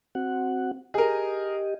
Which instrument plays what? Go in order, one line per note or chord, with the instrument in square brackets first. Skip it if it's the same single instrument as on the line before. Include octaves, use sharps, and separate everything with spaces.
[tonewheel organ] C4 F#4 F#5
[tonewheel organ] G4 D#5 [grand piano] G#4 A#4